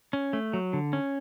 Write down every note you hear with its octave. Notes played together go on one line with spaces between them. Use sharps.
C#4
A3
F#3
D3
C#4